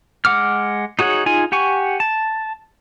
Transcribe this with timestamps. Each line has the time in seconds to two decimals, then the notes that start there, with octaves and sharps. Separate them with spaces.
0.25 G#3 F#5 D6 F6
0.99 D#4 F#4 G#4 C#5 F#5
1.26 D#4 F4 G#4 G#5
1.52 G4 F#5 G#5 C#6
2.00 A5